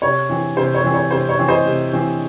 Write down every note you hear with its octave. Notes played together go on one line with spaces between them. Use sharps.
C3 C#5
E3 C4
C3 C5
C#5
E3 C4
C#5
C3 C5
C#5
E3 C4
C5 D#5
C3
E3 C4